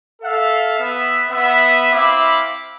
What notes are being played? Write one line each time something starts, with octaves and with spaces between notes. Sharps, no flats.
A4 E5 F5
B3 E5
B3 E5
C4 E4 E5 F5 B5 D6